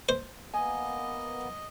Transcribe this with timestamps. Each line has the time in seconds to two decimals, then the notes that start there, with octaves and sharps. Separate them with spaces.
0.09 C5
0.54 A#3 B3 D#5 G#5